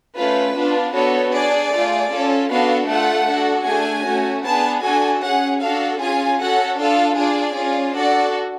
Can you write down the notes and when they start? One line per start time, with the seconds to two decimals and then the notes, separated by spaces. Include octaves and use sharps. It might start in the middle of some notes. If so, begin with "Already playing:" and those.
0.15 A3 C#4 F4 B4
0.55 B3 D4 F4
0.93 B3 D4 F#4 A4 C#5
1.33 D4 G#4 D5
1.72 A3 F4 G#4
2.11 C#4 F4 A4
2.49 B3 D4 F#4 A4 F5
2.88 A3 F4 A4 F#5
3.27 D4 F#4 A4
3.66 A3 D4 G#4 G#5
4.05 A3 C#4 F#4
4.44 B3 D4 G#4 A5
4.83 D4 F#4 A4 G#5
5.22 C#4 G#4 F#5
5.60 D4 F#4 A4 F5
6.00 C#4 F4 G#4 G#5
6.39 C#4 F#4 A4 F#5
6.78 D4 F4 A4 F5
7.17 D4 F4 G#4 D5
7.56 C#4 F4 G#4
7.95 D4 F#4 A4 D5